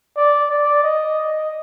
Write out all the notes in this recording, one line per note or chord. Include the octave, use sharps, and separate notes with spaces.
D5
D5
D#5